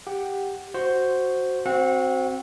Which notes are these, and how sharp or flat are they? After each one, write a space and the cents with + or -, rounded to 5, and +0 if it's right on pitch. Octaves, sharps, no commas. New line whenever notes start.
G4 +5 F#5 +0
F#4 +0 C5 +0
C4 +5 F#4 +0 F#5 -30